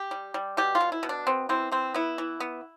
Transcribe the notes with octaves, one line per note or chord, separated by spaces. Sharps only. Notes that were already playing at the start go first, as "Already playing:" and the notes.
Already playing: G4
G3
G3
B2 G4
F4
B2
E4
B2
D4
B3 C4
E3 C4
E3 C4
B3 E4
E3
B3